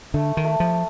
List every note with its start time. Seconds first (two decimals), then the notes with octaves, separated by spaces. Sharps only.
0.14 D3 A3
0.37 D#3
0.45 A3
0.60 F3